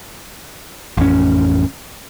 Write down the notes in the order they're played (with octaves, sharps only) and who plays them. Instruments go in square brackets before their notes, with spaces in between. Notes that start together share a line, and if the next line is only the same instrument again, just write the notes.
[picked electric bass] A1 F2 C#4